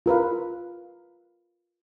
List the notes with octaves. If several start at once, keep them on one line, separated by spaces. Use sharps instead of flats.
F4 A#4 B4 F5